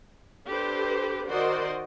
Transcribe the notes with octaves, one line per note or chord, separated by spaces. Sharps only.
D4 G4 A4 B4 C5
D#3 F#4 C5 D5 D#5 C6